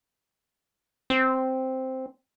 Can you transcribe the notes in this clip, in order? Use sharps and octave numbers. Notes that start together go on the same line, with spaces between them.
C4